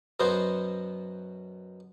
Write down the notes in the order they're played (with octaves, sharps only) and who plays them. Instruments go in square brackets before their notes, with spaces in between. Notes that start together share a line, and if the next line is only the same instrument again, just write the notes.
[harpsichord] F#2 B2 B3 C5